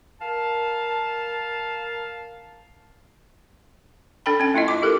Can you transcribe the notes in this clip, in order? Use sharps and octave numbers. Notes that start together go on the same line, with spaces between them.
A#4 F5 A5
D4 A4 G5 B5
C#4 G5
A3 E4 F4 D#5
D#5 D6
G4 A4 A#4